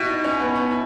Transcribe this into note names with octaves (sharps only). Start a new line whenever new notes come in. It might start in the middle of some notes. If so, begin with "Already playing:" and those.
Already playing: B2 E4 G4
D#4
C#4
B3
B3
E4